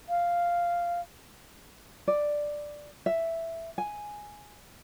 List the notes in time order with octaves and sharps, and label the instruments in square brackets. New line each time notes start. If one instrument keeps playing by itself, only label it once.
[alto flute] F5
[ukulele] D5
E5
G#5